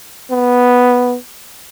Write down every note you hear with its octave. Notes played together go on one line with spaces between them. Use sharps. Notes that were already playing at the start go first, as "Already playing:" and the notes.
B3